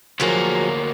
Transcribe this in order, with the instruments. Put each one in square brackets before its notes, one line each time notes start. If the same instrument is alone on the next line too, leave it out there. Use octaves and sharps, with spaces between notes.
[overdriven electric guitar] D2 A#3 [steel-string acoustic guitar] F3 F#3 G#4